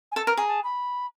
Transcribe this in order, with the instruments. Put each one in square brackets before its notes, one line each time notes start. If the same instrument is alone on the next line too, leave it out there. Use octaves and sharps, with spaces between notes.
[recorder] G#5
[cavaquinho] A4 [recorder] A5
[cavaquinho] A#4
[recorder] A#5
[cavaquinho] G#4
[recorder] A5
B5